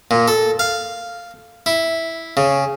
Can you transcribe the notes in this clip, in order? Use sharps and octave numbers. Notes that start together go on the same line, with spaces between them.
A#2
A4
F5
E4
C#3